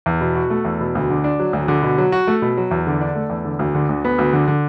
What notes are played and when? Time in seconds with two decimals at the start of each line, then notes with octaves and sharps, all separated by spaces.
0.06 E2
0.21 B2
0.35 F#4
0.50 A3
0.65 E2
0.81 B2
0.95 D2
1.10 D3
1.24 D4
1.40 F#3
1.53 D2
1.68 D3
1.82 B2
1.98 F#3
2.12 F#4
2.27 A3
2.42 B2
2.57 F#3
2.71 E2
2.87 D3
3.01 D4
3.15 A3
3.30 E2
3.45 D3
3.59 D2
3.75 D3
3.89 D2
4.05 B3
4.18 D2
4.33 D3
4.48 D3